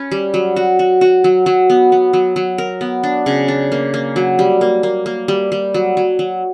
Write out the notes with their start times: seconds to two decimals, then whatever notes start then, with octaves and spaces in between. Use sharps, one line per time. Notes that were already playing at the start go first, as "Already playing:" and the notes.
Already playing: C#4 B4
0.12 G3
0.34 F#3
0.56 F#4
0.79 F#4
1.01 F#4
1.24 F#3
1.46 F#3
1.70 B3
1.92 B3
2.13 F#3
2.36 F#3
2.58 A#4
2.81 B3
3.04 D4
3.26 C#3
3.48 D4
3.72 A#3
3.94 A#3
4.16 F#3
4.39 G3
4.61 A#3
4.83 A#3
5.06 A#3
5.28 G3
5.52 G3
5.74 F#3
5.97 F#3
6.19 F#3